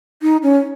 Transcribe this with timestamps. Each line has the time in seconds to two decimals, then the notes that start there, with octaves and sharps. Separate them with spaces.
0.22 D#4
0.43 C#4